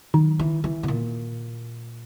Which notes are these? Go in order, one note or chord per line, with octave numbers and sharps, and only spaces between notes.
D#3 F#3
E3
E3
B2
A#2